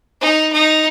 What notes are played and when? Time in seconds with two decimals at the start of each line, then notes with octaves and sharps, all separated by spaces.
0.21 D#4
0.52 D#4